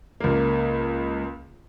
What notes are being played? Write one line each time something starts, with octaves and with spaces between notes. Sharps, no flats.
C#2 A#3